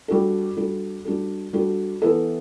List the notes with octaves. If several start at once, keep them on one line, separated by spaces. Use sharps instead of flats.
G3 D4 F#4 A4
G3 D4 F#4 A4
G3 D4 F#4 A4
G3 D4 F#4 A4
E3 B3 E4 A4